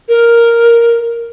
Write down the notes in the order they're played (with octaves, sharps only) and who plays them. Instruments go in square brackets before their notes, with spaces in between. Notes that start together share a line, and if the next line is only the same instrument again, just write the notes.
[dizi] A#4